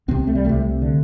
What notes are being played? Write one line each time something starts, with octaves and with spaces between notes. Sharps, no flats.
C2 C3 C4
A3
G3
C2 C3 A3
D3